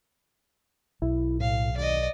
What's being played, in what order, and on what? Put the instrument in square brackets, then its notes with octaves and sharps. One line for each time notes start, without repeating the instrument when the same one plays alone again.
[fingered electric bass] B1 [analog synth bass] E4
[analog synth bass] A2 [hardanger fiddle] F5
[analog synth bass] D#2 [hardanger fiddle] D5 D#5